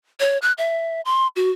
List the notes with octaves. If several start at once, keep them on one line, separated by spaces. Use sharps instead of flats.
C#5
F#6
E5
C6
F#4